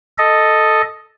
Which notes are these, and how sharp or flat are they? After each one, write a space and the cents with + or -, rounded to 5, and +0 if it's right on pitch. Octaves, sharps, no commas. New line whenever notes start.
A4 +0 D#5 +0